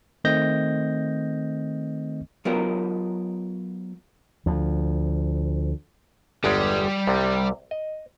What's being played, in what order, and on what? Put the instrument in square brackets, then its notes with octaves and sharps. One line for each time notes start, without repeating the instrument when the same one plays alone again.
[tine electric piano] D#3 A3 C4 D#5 G6 A#6
[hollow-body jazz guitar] F#3 B3 F4 G4 A#4 D#5
[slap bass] D2 F3
[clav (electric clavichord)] G1 E2 G#3 [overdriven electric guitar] G3
[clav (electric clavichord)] C2 C3
D#5